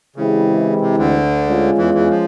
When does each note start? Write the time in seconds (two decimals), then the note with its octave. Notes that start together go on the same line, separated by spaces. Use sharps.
0.16 C#3 E3 G#3 C4 E4 G4
0.81 C3
0.96 D2 D3
1.45 G#3 C#4 F4
1.78 E2 E3
1.94 E2 E3
2.10 F3